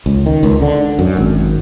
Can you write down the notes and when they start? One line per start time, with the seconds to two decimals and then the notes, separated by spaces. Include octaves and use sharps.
0.06 C#2
0.26 D#3
0.43 C#2
0.62 D3
0.99 F#2
1.17 G#1